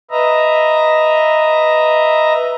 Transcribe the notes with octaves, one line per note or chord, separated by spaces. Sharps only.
B4 D#5 E5 A#5